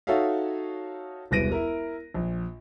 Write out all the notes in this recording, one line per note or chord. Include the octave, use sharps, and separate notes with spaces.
D#4 F#4 A4 C#5 E5 F5
E1 C2 B4 A#6 D7 D#7
E4 A#4
A#1